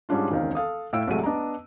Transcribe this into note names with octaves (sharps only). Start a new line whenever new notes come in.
G#2 G3 C#4 D4 F4
E1 C#2 D#3 C4 F5
A4 F5 D#6
A2 E4 F5 G5 E6 D7
C2 F#3 G#3 A3 D#7
B3 D4 D#5 A#5